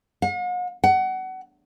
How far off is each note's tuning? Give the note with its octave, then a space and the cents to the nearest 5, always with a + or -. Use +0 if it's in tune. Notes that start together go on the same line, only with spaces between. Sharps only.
F#5 -45
F#5 +25